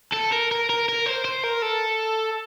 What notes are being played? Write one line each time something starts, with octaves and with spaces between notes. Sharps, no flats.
A4
A#4
A#4
A#4
A#4
C5
C5
A#4
A4